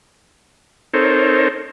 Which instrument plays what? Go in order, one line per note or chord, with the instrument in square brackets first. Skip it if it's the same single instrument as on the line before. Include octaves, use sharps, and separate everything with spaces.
[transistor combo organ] C4 D#4 A4 A#4 C5 C#5